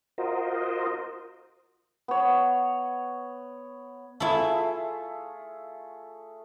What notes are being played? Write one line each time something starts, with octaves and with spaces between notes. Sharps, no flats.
F4 F#4 A#4 C5 D#5
B3 C#5
A3 E4 F4 G#4 A4